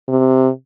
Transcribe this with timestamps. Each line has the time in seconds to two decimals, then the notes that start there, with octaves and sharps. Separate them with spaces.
0.08 C3